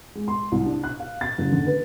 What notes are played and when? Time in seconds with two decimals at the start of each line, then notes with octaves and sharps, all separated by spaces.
0.15 G#3
0.28 C6
0.52 C2
0.66 D4
0.84 F#6
1.00 F5
1.21 A6
1.38 F#1
1.52 D3
1.67 B4